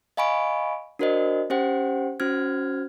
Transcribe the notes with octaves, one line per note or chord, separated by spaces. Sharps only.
D#5 F5 G#5 B5 C#6 D7
D4 F#4 A#4 C5 D5 D#5
C#4 G4 C5 F#5 G5
C#4 F#4 C5 F6 G#6